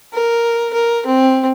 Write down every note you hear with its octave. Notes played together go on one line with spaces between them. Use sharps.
A#4
A#4
C4